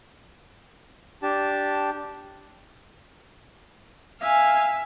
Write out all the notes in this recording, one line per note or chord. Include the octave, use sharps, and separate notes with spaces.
D4 G4 A5
E5 F5 G#5